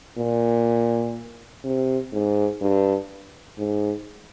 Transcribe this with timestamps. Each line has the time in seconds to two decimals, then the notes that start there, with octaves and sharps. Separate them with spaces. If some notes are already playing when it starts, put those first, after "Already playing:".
0.18 A#2
1.64 C3
2.12 G#2
2.61 G2
3.58 G#2